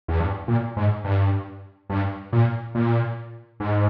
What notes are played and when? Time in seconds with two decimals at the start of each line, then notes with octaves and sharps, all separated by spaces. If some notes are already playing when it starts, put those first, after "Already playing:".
0.08 E2
0.20 G2
0.48 A#2
0.77 G#2
1.04 G2
1.90 G2
2.33 A#2
2.75 A#2
3.60 G#2